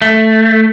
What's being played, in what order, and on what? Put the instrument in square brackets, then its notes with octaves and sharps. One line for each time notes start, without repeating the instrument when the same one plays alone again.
[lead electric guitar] A3